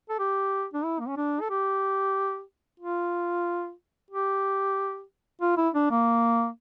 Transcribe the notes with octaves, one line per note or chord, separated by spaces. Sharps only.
A4
G4
D4
E4
A#3
C#4
D4
A4
G4
F4
G4
F4
E4
D4
A#3